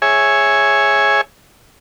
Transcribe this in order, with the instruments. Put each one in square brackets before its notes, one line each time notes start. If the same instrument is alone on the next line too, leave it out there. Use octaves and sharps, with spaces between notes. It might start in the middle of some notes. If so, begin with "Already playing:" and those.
[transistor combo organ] G#4 C#5 E5 G#5